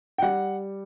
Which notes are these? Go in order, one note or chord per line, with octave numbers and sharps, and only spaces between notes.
G5
G3 F#5